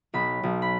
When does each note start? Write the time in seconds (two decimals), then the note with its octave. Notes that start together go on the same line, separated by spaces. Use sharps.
0.14 B1 B5
0.43 B1
0.62 B5